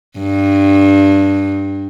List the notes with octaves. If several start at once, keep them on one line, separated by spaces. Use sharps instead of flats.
G2